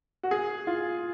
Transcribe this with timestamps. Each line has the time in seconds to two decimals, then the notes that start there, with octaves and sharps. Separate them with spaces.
0.23 F#4
0.31 G#4
0.67 F4